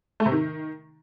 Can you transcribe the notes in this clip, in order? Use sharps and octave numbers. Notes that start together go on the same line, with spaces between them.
A3
C3
D#3